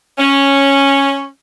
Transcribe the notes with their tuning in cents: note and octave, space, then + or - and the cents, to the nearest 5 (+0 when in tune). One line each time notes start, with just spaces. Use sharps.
C#4 -5